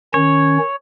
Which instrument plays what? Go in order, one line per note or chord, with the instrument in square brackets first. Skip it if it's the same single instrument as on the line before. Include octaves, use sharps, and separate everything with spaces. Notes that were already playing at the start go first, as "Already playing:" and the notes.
[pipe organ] D#3 C#4 [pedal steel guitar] C#5